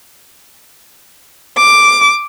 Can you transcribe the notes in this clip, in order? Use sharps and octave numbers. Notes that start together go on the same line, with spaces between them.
D6